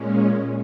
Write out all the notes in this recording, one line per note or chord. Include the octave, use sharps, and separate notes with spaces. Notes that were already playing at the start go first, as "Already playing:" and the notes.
Already playing: A#2 G#3 C#4